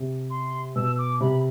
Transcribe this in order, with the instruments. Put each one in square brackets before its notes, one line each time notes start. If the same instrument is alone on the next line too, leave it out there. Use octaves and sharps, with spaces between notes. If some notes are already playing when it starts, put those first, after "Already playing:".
Already playing: [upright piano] C3
[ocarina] C6
[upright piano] B2 [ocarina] E6
[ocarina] D6
[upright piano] C3 [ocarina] B5